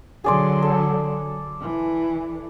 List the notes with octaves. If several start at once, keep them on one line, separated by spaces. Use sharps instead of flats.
D3 F#3 G#4 D5 C6
A4
E3